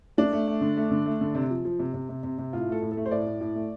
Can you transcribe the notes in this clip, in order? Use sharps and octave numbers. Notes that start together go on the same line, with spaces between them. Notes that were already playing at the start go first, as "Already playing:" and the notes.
A3 D4
A3
A3
D3
A3
D3
A3
D3
C3
F3
F3
C3
C3
C3
C3
C3
A2 F4
A3 A4
A2
A4
A3
C5
A2 D5
A2
A2
A3